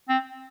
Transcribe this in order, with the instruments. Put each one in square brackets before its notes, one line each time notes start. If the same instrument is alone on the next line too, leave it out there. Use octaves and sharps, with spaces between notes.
[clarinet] C4